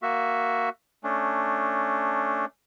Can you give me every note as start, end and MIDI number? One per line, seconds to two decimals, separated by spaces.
0.02 0.69 58
0.02 0.69 66
0.02 0.69 76
1.04 2.45 57
1.04 2.45 61
1.04 2.45 62